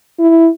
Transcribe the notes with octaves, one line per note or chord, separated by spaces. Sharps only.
E4